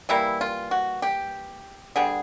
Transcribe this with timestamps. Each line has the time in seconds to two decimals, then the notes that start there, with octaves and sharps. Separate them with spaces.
0.09 E3 G3 A#3 E4
0.41 F4
0.71 F#4
1.02 G4
1.96 D3 G3 B3 G#4